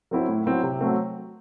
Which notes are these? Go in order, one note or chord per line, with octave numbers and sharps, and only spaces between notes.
F#3 C4 E4
A2
F#3 C4 E4
C3
F#3 A3 C4